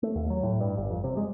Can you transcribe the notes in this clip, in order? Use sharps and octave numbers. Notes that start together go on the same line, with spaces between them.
A3
D#2
F#3
A2
G2
G1
F2
C3
G#3